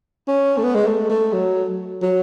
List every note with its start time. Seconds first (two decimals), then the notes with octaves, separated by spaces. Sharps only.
0.28 C#4
0.57 A3
0.63 B3
0.75 G#3
0.87 A3
1.09 A3
1.33 F#3
2.02 F#3